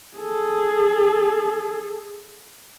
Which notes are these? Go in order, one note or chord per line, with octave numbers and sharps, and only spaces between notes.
G#4 A4